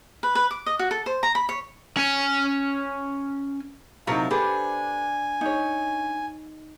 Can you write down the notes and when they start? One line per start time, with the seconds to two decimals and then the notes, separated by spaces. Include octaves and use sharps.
0.23 B4
0.35 B4
0.51 D6
0.66 D#5
0.79 F#4
0.91 A4
1.06 C5
1.23 A#5
1.35 B5
1.49 C#5
1.97 C#4 G#5
4.07 C3 F#3 D#4 E4 A#4 F5 A5
4.31 D4 G4 A4 B4 C5 G#5
5.41 D#4 C#5